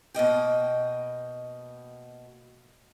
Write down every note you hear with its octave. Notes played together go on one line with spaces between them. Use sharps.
B2 A#3 D#5 G5